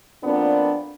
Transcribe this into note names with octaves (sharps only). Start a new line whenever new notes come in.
F2 A#2 B3 C4 D4